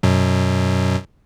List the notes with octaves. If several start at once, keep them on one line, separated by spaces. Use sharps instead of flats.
F#2 B2 F#3